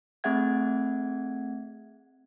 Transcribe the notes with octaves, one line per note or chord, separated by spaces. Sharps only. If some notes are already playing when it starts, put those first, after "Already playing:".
A3 C4 G#4 E5 F#5 G#6